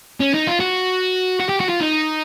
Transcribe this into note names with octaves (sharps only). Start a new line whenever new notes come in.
C#4
D#4
F4
F#4
F#4
G4
F#4
F4
D#4